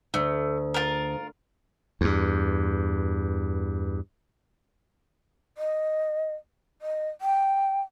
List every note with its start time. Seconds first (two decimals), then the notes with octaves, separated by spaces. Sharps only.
0.14 D2 A3
0.74 F4 A#4
2.01 E2 G2
5.58 D#5
6.82 D#5
7.21 G5